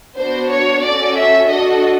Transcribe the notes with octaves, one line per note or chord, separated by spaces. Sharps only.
B3 D4 F#4 C5
C#5
C#4 F#4 A4 D5
E5
D4 F#4 A4 D#5